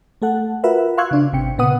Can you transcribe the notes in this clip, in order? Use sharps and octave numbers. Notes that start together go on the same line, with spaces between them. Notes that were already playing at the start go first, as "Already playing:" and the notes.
A3 A4 F#5
F4 F#4 A#4 B4 E5 F#5
F5 C6 C#6 E6 F#6 G#6
C#3 D4
G#1 C3 G5 C#7
A#2 C#3 B3 B4 F#5 D#6